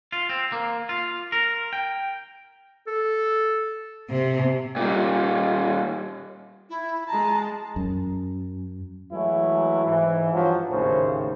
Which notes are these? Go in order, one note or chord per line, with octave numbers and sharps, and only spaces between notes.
F4
C4
A#3
F4
A#4
G5
A4
C3
A#2 G3
E4
G#3 A5 A#5
F#2
E3 F#3 G#3 A3 E4
G#2 E3
G2 F3 F#3
G#1 D#2 A2 C#3 C5